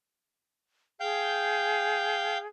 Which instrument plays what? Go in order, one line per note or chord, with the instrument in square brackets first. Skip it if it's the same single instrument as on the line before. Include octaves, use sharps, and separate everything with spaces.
[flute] G#4 [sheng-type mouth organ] F5 G5 G6